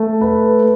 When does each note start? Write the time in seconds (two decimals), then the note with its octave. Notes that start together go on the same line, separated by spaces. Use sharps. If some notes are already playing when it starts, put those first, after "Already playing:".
Already playing: A3
0.21 B4